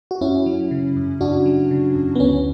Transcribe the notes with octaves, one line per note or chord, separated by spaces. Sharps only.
F#4
F#2 C#4 E4
F#3
C#3
F#2
F#2 D4 F#4
F#3
C#3
F#2
B3
D2 C#4